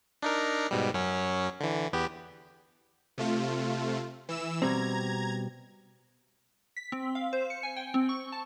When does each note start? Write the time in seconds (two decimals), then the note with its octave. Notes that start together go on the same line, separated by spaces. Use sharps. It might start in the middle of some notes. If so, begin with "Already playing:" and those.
0.23 D4 D#4 A#4
0.71 G#2 B2 G3
0.94 F#2 F#3 C#4
1.60 D3 E3
1.93 E2 B3 G4
3.18 C3 A3 F4
4.29 E3 E6 E7
4.62 B2 G3 C4 A#5 G#6
6.77 B6
6.92 C4
7.15 F5
7.33 C5
7.50 C#7
7.63 G#5
7.76 G5
7.94 C4
8.09 C#6
8.32 A5